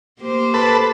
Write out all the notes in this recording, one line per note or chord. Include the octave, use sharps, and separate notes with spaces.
A#3 G4 C5
A4 B4